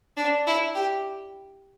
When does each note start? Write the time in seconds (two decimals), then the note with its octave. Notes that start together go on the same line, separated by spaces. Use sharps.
0.17 D4
0.47 E4
0.75 G4